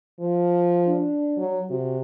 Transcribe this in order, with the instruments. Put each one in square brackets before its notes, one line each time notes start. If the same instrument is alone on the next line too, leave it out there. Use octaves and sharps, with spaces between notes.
[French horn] F3
[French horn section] D4
[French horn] F#3
[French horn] C3 [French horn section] F#4